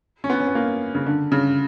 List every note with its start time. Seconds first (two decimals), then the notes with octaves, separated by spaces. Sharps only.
0.24 C#4
0.30 B3
0.40 C#4
0.47 B3
0.55 A#3
0.95 C#3
1.06 D3
1.32 C#3